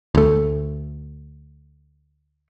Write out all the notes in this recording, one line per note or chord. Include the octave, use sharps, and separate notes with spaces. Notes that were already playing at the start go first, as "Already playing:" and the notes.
D2 A3